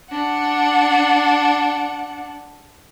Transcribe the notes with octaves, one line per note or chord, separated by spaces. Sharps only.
D4 F#5